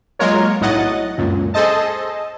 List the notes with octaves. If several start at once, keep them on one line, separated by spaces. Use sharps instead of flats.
F#3 G#3 A#3 F4 A#4 C#5
B1 A2 F#3 D#5 F#5 A6
C#2 F#2 A#2
G#4 A4 C5 D#5 A5